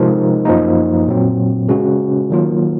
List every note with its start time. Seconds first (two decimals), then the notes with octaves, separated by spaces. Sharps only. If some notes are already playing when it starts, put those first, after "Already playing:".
Already playing: C3 F3 G#3 D#4 A#4
0.45 F#2 F3 A#3 D#4
1.07 A#2 F#3 C4
1.68 C#3 G#3 C#4 F#4
2.30 D#3 F#3 A#3 F4